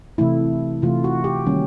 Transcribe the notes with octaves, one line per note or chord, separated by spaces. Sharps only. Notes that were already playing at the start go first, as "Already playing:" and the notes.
C3 E3 A3 E4
C3 E3 A3 F4
F#4
G4
D#3 G3 A#3 C#4